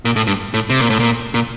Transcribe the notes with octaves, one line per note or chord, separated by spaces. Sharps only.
A#2
A2
G2
A2
C3
A#2
A2
A#2
A#2